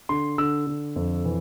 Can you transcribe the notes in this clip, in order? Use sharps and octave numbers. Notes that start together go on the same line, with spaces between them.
D3 C6
D3 E6
D3
F2
E3